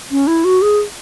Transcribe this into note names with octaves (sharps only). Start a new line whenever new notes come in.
C#4
E4
F#4
G#4